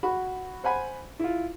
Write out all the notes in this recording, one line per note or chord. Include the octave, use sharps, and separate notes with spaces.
F#4 B5
C5 F#5 G#5 B5
E4 F4